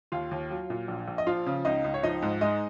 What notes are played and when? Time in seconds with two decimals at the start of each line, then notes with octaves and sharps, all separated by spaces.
0.12 D#2 F4 F5
0.31 D#2
0.51 F#3
0.70 A#2
0.88 A#1
1.08 A#1
1.18 D#5
1.27 F3 F4 F5
1.46 C#3
1.65 C#2 D#4 D#5
1.84 C#2
1.94 C#5
2.03 F3 D#4 D#5
2.22 G#2
2.41 G#3 D#4 D#5